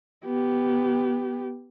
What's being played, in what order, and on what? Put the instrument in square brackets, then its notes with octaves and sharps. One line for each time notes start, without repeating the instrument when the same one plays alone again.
[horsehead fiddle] B3 G4